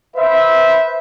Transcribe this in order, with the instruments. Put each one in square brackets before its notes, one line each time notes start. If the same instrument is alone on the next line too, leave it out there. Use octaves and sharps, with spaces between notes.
[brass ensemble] B4 C5 E5